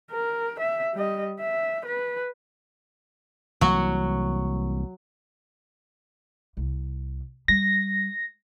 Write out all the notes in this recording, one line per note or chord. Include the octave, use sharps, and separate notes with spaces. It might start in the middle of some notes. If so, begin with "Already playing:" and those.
A#4
E5
G3 D#5
E5
B4
C2 E3 F#3 A#3 F#4
C2
G3 A#6